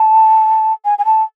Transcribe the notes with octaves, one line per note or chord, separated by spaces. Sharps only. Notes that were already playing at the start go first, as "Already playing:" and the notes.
Already playing: A5
G#5
G#5
A5